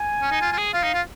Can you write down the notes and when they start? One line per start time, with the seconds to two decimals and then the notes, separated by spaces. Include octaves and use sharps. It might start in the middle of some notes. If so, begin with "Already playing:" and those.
Already playing: G#5
0.22 C#4
0.31 D#4
0.42 F4
0.53 F4
0.58 G#4
0.73 F4 F5
0.83 D#4
0.94 F4